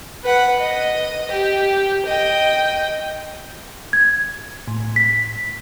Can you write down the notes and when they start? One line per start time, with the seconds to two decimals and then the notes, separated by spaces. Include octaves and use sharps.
0.24 B4 F#5
0.60 D#5
1.32 G4
2.06 D#5 G5
3.93 G#6
4.67 A2
4.96 B6